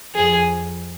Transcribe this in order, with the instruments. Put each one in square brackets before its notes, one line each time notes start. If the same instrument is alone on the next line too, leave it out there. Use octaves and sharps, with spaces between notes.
[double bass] F2 [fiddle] G#4